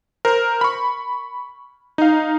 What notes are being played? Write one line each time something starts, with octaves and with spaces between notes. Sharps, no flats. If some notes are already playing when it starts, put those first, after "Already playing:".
A#4 C5
B5 C#6
D#4 F5